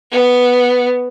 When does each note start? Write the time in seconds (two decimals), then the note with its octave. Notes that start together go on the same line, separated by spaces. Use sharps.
0.11 B3